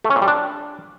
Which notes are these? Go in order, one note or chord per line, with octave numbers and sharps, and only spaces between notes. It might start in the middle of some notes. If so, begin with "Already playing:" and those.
A3
C#4
A#2
G3
D4